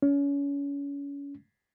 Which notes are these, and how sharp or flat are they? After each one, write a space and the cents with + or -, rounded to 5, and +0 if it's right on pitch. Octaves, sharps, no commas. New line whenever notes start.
C#4 +30